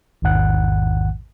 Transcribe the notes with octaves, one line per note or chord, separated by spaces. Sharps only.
A1 E2 G#2 D#3 F#5 F#6